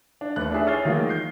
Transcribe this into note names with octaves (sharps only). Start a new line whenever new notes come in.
D4
D#2 A3 B4 F#6
D4 E4 G4 G#4 E5
C#5 D#6 F6 A6 C7 G7
D#3 E3 F#3 G#3 A#3 F4
G6 C7